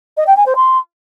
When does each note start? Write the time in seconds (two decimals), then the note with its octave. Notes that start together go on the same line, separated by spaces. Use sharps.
0.17 D#5
0.27 G5
0.36 G#5
0.46 C5
0.56 C6